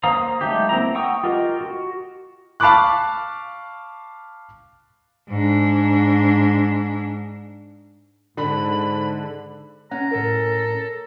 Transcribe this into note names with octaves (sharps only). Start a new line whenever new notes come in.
A#3 C5 F5 A#5 D#6
F#3 G#3 A3 D#4 G4
A#3 C4 E4 A#5
F#5 G5 C#6 D#6 E6
F4 G4 A#4 D#5
F#4
F5 A5 B5 C#6 D6 F#6
G#2 D4
G#2 D3 B5
C#4 F#5 A#5
A2 A4 A#4